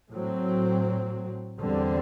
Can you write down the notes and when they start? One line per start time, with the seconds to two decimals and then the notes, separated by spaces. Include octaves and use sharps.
0.11 A2 F#3 C4
1.59 E2 D3 G3 C4